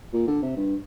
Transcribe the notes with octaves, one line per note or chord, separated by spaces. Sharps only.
A#2
D3
C3
G2